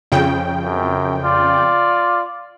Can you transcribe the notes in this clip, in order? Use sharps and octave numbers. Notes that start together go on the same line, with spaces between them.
F2 C#3 G5
F#2
F4 D5